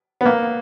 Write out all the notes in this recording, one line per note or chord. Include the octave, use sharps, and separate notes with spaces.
B3
A#3